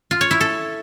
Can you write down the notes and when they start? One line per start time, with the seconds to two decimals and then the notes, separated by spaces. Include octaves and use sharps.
0.11 F4
0.21 C#5
0.31 E4
0.41 A4